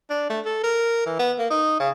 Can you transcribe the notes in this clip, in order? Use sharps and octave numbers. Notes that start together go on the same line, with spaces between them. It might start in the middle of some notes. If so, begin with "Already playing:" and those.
D4
A3
A4
A#4
E3
B3
A#3
D#4
C#3